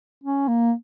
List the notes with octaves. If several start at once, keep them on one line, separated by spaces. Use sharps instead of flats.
C#4
A#3